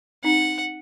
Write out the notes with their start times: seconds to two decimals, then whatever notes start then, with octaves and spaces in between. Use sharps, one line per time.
0.24 C4 D#4 F#5